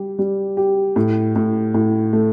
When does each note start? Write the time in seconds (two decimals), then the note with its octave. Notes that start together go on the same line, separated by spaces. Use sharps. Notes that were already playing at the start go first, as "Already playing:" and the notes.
Already playing: G3 G4
0.19 G3
0.57 G4
0.96 A2
1.36 A2
1.74 A2
2.13 A3